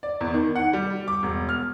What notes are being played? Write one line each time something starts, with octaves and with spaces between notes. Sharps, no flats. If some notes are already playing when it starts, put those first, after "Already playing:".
D5
E2
D#3
F#5
G3
D6
E1
F6